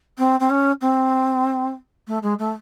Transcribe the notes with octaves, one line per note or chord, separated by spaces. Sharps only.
C4
C4
C#4
C4
A3
G#3
A3